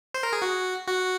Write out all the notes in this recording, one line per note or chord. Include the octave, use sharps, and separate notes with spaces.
C5
A#4
G#4
F#4
F#4